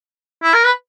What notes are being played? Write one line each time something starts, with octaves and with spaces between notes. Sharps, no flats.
E4
A#4
B4